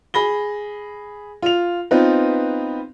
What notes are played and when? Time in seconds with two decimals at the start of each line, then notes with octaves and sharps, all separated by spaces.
0.14 G#4 B5 A#6 G7
1.42 F4 F7
1.91 B3 C4 D#4 F4 B4